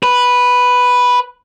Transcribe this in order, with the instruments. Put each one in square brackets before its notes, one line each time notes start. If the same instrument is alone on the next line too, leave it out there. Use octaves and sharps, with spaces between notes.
[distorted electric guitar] B4